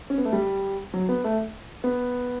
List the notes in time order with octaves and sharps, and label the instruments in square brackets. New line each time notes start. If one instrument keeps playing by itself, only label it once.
[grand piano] C#4
B3
A3
G3
F#3
B3
A3
B3